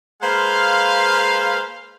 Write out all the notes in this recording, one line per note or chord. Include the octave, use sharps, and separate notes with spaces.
G#3 A#3 B4 C5 F5